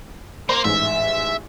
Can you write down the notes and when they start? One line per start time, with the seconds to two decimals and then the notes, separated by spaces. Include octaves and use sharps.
0.49 A#3 C5
0.65 A1 G#2 E5